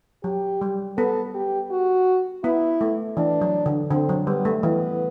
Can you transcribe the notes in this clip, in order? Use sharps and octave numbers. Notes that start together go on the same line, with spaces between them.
F#3 G4
G3
B3 A4
G4
F#4
B3 E4
A3
E3 D4
F#3
D3
D3 C4
F#3
G3 B3
A3
E3 B3